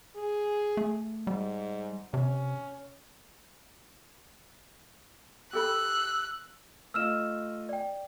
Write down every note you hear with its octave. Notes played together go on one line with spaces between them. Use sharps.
G#4
A3
G#2 G3
C3 C#4
G4 A4 B5 E6 F#6
A3 F4 D#5 E6 F6 E7
D5 G5